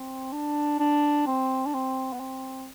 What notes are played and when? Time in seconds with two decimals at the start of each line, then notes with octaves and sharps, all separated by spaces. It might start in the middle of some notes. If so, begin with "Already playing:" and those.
Already playing: C4
0.32 D4
0.80 D4
1.27 C4
1.66 D4
1.74 C4
2.13 B3
2.20 C4